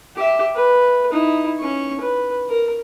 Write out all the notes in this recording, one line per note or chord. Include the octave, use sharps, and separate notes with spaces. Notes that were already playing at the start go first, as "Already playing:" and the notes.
G4 E5
B4
D#4 E4
C#4 C#6
B4
A#4